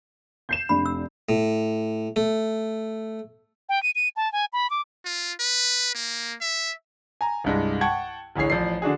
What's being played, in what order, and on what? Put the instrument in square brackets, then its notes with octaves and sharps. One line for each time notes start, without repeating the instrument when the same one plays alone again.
[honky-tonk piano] G6 C7 E7
[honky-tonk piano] F1 D4 [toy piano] B5
[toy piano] E6
[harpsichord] A2
A3
[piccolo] G5
D#7
D#7
A5
G#5
B5
D6
[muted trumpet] F4
B4
A#3
E5
[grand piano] G#5 A#5
C2 G2 G#3
F#5 G5 A5 C#6 G#6
A1 D2 E3 G#4 C#5 C7
A1 F3 D5 C7
D3 D4 F#4 G#4